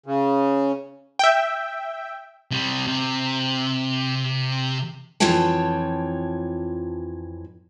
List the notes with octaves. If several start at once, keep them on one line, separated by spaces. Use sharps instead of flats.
C#3
E5 G5
C3 G3
C3
F2 E3 F4 C#5 G5 A5